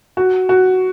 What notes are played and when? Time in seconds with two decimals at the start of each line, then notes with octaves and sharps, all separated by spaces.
0.17 F#4
0.49 F#4